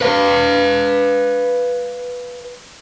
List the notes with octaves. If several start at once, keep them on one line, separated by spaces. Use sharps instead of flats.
B4 F5